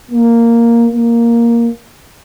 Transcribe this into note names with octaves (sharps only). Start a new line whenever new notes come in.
A#3
A#3